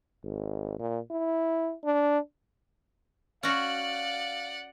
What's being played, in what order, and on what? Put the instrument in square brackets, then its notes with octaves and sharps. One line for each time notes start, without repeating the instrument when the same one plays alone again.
[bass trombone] G#1
A#2
E4
D4
[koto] C#4 F#4 [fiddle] D5 F#5 [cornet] F5